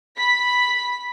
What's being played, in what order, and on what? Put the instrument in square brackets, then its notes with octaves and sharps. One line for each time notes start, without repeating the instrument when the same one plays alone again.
[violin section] B5 B6